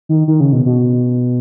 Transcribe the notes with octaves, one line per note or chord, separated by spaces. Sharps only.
D#3
D#3
C#3
B2
B2